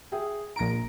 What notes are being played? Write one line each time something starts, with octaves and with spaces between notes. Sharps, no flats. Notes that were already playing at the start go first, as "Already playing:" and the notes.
G#4 E5 G5
A#1 A#5 A#6 D7